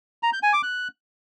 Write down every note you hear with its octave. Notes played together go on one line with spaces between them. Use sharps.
A#5
G6
G#5
D6
F#6